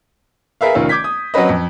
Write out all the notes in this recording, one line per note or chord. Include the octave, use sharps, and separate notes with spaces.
G#4 A#4 B4 E5 F5
F1 D#3 C#4 F4 E6
D6 G6 G#6 B6
D#6
F#3 C4 C#4 B4 D#5
F2